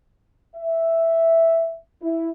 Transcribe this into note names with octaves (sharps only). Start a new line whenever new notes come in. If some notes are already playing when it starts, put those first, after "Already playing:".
E5
E4